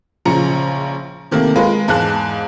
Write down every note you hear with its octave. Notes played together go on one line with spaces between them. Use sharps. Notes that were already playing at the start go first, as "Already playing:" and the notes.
A#1 C#3 F3 A#5 C#7
C3 D#3 A3 A#3
G#3 F4 A#4 B4
E2 G#2 F5 A5 F#6